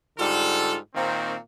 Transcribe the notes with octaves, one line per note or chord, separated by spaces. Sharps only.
G#2 D3 G3 F4 A4
A#2 D#3 A#3 C4